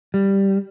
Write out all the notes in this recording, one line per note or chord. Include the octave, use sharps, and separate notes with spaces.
G3